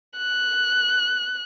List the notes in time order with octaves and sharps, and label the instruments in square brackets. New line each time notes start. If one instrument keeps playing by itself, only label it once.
[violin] F#6